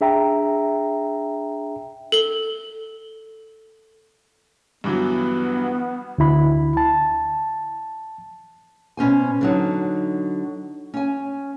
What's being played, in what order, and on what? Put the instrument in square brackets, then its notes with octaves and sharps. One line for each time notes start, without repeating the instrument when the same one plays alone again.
[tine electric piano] D4 G#4 E5 G5 A#5
[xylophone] A4 G7
[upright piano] G2 E3 F#3 [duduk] B3
[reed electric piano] D2 D3 E4 B5
A5
[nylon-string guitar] B2 C#4 C5 G#5
D3 F#3 D#4
C#4 G#5